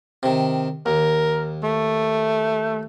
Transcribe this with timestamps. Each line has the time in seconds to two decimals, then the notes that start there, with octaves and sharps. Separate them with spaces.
0.23 C3 D#3
0.86 D#2 A#4
1.63 A3